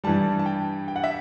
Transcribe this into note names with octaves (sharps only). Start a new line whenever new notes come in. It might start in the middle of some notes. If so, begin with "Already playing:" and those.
G2 E3 G3 A5
A5
G5
G5
F#5
E5